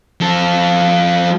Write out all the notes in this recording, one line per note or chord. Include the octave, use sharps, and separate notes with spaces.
F3 A4